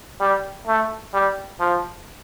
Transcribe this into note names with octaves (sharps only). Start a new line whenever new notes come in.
G3
A3
G3
F3